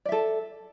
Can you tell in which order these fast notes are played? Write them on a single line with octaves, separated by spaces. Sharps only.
D5 E5 A4